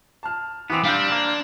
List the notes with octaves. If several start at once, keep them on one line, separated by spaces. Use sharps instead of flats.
A5 F6
E3 B3 C4 D6 F7
G3 C4 D4 F5 F6 G6
A#3